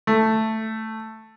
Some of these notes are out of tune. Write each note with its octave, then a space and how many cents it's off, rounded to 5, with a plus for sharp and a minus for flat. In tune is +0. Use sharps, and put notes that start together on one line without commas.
A3 +5